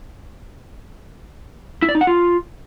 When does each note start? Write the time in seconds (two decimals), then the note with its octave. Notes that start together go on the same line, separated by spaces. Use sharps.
1.82 E4
1.89 D5
1.95 D#4
2.01 F#5
2.07 F4